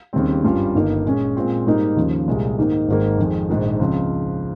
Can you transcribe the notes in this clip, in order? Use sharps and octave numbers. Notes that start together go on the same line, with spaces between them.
D#2 C#3 G3 C4
G#1 G2 G3 C#4 F4
G1 G2 D#3 A#3 D#4
A#2 G#3 C#4
A#2 G#3 C4 F4
G#2 G3 A#3 D#4
D#2 C#3 F3
C2 A#2 G#3
G#2 D#3 A#3 D#4
G#1 G#2 D#3 A#3
F2 D#3 G#3
A#1 G#2 D#3
C#2 C#3 F3 C4 F4